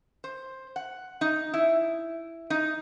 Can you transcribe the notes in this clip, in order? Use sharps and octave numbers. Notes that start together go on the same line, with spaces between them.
C5
F#5
D#4
E4
D#4